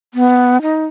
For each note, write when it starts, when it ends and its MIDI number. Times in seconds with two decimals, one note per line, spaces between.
0.14 0.61 59
0.62 0.85 63